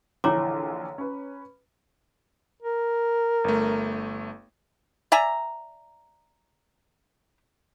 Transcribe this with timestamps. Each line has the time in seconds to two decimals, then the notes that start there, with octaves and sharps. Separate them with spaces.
0.24 A#1 D3 E3 C#5 A#5 D6
0.98 C#4 B4
2.62 A#4
3.44 G1 A3
5.12 D5 E5 G#5 A#5